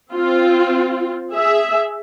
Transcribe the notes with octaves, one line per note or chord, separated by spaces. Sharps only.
C4 F4
G#4 E5